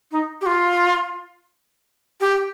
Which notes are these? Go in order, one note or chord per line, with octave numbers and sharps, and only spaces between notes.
D#4
G4
F4
G4